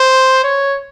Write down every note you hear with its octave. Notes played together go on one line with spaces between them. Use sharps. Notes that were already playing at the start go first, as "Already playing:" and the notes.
Already playing: C5
C#5